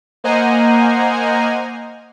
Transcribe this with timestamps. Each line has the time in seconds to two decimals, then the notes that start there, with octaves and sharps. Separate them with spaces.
0.24 A#3 C5 D#5 F#5 G#5 A#5